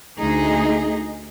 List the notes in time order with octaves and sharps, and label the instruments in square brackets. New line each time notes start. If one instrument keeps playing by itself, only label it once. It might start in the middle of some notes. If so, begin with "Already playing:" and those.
[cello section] D2 D#4 G#4